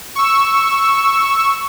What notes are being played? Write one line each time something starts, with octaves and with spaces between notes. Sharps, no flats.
C#6 E6